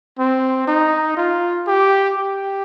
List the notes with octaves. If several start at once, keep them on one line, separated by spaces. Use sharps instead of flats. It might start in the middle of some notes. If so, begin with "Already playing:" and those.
C4
D#4
F4
G4
G4